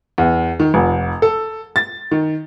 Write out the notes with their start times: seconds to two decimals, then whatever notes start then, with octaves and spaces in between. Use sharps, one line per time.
0.18 E2
0.60 D#3
0.74 F1
1.22 A4
1.76 A6
2.11 D#3